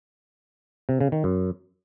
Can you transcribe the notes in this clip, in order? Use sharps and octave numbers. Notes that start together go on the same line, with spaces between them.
C3
C#3
D#3
F#2